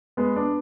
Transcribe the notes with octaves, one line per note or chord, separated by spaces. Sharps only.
G#3 B3
B3 D4